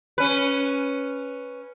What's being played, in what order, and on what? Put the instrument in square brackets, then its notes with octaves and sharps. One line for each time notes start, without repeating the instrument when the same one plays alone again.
[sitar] C#4 B4